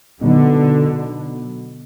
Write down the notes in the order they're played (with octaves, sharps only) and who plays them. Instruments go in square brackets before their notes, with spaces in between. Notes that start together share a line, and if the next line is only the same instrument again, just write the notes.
[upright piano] B2 F#3 B3 D#4 [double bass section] D3